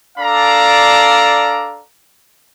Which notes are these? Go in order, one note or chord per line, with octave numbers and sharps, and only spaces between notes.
D4 A4 D5 F5 A#5